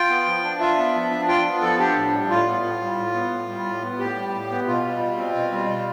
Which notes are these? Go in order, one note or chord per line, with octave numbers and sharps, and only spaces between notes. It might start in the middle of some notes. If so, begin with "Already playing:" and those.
Already playing: F4 G5
B3
F3
D4
F4 E5
B3
F3
D4
F4 G5
B3
F3 A4
D4 G4
A2
G3
A2 F4
B3
A2
G3
A2
B3
A2
G3
A2
B3
A2 G4
G3
A2
B3
B2 F4
G3
B2
C4
B2
G3
B2